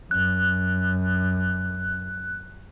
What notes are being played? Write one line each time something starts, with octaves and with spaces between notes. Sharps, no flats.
F#2 F#6